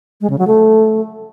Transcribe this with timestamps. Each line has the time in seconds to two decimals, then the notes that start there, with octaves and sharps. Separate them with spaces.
0.21 G#3
0.30 C#3
0.39 F#3
0.47 A3